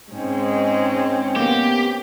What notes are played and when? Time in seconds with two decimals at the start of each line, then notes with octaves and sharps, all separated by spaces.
0.12 G#2 G#3 C4 C#4
1.36 A#3 B3 G4